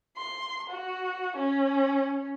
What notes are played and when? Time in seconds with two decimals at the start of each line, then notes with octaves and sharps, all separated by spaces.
0.17 C6
0.70 F#4
1.37 C#4